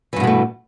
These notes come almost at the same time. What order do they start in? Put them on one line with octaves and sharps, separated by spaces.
E3 G2 B2 G#3 A3